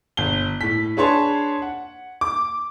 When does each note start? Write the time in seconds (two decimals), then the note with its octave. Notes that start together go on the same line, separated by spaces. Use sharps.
0.17 G1 G7
0.61 A2 B6
0.97 D4 G#4 B4 C#5 A5 C6
1.62 F#5
2.21 D6